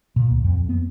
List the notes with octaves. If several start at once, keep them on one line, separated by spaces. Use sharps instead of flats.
A#2
D2
F2
B3